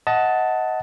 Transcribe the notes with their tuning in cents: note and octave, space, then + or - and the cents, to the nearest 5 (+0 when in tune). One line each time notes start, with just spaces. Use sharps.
D#5 +25 F#5 +0 A5 +0